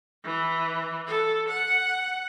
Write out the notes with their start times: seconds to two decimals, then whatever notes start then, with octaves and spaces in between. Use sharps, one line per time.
0.24 E3
1.07 A4
1.49 F#5